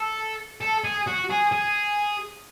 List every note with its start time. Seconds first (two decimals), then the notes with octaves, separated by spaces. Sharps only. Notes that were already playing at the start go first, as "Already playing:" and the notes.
Already playing: A4
0.61 A4
0.84 G#4
1.07 F#4
1.30 G#4
1.52 G#4